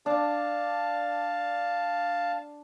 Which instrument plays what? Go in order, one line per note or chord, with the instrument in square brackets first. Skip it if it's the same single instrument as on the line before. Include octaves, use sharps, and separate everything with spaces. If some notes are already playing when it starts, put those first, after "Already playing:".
[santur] D4 [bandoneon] F5 A5